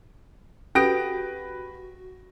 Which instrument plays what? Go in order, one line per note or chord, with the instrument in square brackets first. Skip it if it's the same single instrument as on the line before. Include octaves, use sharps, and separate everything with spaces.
[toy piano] C#4 A4 [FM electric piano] F#4 [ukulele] G4 [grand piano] B4 A#6 D7